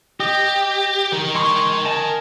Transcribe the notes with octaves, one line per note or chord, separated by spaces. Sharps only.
G4 D#5
A#4 G5
G#3 C6 C#6
D#5 G#5 A5